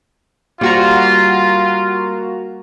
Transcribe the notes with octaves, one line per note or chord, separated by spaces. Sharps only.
G3 A#3 F4 F#4 A#5